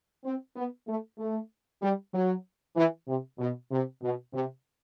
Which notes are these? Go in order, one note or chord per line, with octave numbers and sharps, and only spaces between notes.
C4
B3
A3
A3
G3
F#3
E3
C3
B2
C3
B2
C3